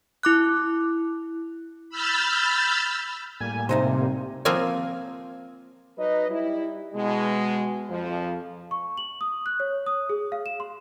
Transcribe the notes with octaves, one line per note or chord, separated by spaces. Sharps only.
E4 D6 F#6
B5 E6 F6 G6 A6
A2 G3 A#3 G#5
C3 A3 D#4 C5
F3 A#3 C4 F4 A#4 G#5
F#3 D#4 B4 D#5
G3 E4
B2 G#3
F2 F3
C#6
F#7
D#6
F#6
C#5
D#6
G#4
F5
E7
C6